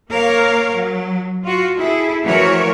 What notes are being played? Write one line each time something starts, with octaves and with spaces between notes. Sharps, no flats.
A#3 A#4 C#5 F5
F#3
F4 F#4
E4 G#4 A4
E3 F3 A3 F#4 A#4 C#5